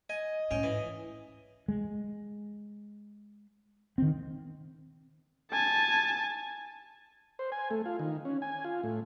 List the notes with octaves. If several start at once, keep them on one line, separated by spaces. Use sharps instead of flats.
D#5 G#5
G#1 A2 C#4 G5
E3
G#3
D#3 C4
G#5 A5
C5
G#5
A3
F4
D#3
C#4
G#5
F4
A2